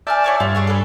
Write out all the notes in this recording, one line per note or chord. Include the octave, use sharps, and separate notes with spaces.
D5 E5 G#5 A5 F6 G6
E4 C#5 D6
G2 F4
D4 G#4 C#5
A4 B4